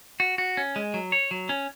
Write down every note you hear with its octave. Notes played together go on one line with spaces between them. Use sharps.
F#4
F#4
C#4
G#3
F#3
C#5
F#3
C#4